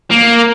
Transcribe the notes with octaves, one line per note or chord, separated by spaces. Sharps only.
A#3